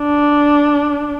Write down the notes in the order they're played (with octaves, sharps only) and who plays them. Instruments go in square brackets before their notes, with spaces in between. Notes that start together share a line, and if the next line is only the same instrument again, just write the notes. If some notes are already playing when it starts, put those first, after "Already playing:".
Already playing: [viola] D4